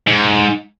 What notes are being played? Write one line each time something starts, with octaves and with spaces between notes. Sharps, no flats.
G#2